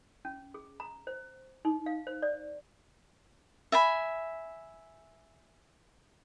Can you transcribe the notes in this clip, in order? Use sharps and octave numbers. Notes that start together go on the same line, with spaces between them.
C#4
G#4
A#5
C5
D#4
F5
C5
D5
E5 G#5 B5